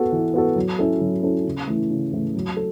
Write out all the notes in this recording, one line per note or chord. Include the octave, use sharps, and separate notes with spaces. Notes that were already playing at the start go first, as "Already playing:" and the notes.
Already playing: B3 F#4 A4
E3
B3 F#4 A4
F#3
C#4 E4 A4
F#3
C#4 E4 A4
C#3
E3 A3
C#3
E3 A3
F#3
A4